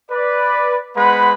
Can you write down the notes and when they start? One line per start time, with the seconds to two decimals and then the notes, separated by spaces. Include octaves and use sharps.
0.11 B4 D5
0.97 G#3 B3 B4 C5 F#5 B5